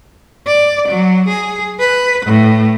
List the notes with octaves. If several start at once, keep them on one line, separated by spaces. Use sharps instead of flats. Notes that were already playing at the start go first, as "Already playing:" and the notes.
D5
F#3
G#4
B4
A2